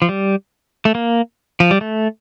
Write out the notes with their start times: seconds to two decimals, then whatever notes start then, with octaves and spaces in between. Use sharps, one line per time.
0.02 F3
0.09 G3
0.85 A3
0.95 A#3
1.60 F3
1.71 G3
1.81 A3